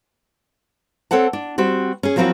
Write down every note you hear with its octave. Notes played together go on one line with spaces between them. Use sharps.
C4 A4 C#5 F#5 A5
D4
G3 C4 F#4
C#4 G#4
F3 F#3 A#3 C4 E4 F#4